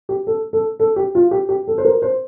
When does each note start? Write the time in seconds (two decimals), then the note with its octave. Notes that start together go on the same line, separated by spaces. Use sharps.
0.09 G4
0.27 A4
0.53 A4
0.80 A4
0.96 G4
1.15 F4
1.31 G4
1.49 G4
1.67 A4
1.78 C5
1.85 A#4
2.02 C5